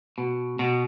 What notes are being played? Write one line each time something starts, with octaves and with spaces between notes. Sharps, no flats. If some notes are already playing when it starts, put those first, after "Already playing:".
B2
B2